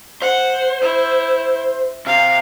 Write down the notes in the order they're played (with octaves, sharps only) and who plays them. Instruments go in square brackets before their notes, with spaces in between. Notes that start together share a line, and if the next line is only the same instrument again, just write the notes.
[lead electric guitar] C5 [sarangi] F#5
[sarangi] E4
[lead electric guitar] C3 [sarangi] F5